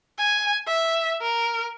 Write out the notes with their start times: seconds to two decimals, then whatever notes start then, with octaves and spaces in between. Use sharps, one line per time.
0.18 G#5
0.68 E5
1.22 A#4